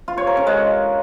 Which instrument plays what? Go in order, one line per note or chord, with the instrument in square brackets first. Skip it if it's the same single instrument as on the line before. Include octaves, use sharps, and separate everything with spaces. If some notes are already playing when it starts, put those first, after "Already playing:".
[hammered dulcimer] F4
C#5
A#4
C#4
G#3